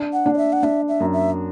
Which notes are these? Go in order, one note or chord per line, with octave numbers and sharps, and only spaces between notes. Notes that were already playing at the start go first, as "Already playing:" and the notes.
Already playing: D4
F#5
D4
D5
E5
F#5
D4 E5
E5
F#2
E5